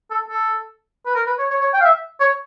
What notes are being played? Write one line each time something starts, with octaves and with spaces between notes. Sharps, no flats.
A4
A4
B4
A#4
B4
C#5
C#5
C#5
G5
F5
E5
C#5